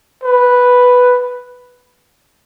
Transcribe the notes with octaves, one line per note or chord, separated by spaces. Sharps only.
B4